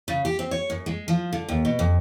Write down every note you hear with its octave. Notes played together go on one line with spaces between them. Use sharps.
C#3
G4
C4
C#5
F#2
G#3
F3
D3
D#2
B2
F2